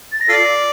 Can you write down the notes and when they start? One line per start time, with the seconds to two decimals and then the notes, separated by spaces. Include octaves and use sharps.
0.12 A6
0.21 A#6
0.29 F4 A4 D5 C7